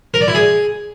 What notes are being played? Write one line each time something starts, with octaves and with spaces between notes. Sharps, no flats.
A#4
D5
E4
G#4